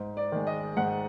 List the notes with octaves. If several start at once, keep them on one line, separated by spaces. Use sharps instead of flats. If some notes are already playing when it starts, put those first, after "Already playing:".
Already playing: G#2
D5
D#3 G#3
D#5
G#2 F#5